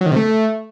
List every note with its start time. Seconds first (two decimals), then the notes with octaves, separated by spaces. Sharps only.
0.01 F#3
0.06 D#3
0.11 C3
0.16 A3